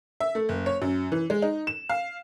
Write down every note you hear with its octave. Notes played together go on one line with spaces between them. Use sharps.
E5
A3
F#1
C#5
F#2
E3
G#3
D#4
E7
F5